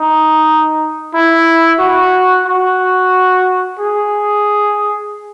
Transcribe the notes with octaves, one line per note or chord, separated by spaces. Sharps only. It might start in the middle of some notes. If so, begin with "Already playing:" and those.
Already playing: D#4
E4
F#4
F#4
G#4